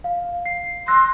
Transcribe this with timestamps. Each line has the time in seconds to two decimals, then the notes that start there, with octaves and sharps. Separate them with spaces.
0.04 F5
0.46 C7
0.88 C6 E6 F#6 A#6